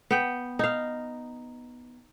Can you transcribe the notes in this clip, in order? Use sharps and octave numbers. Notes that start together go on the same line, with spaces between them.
B3 G5
D#4 F5